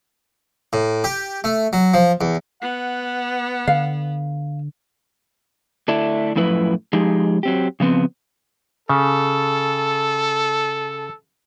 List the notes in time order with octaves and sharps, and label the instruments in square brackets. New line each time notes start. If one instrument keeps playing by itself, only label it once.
[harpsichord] A2
G4
A3
F#3
F3
E2
[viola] B3 [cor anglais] F#5
[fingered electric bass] D3 [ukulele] F5
[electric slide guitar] D3 A3 D4 E4
F#2 A2 F3 E4 B4
F3 G#3 D#4 G4 G#4
F#3 C4 G4
C#3 F3 B3 C4
[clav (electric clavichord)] C#3 [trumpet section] A4